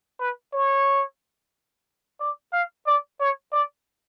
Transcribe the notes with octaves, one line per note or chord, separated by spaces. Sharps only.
B4
C#5
D5
F5
D5
C#5
D5